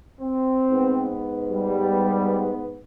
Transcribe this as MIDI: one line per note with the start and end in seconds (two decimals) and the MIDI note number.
0.21 1.14 60
0.71 2.83 44
0.71 2.83 59
1.52 2.51 55